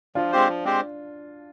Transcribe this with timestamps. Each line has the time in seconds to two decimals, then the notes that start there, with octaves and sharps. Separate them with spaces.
0.15 F3 D4 F4
0.32 G#3 C4 G4 C5
0.48 F3
0.65 G#3 C4 G4 C5